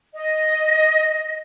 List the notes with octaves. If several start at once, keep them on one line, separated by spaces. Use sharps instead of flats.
D#5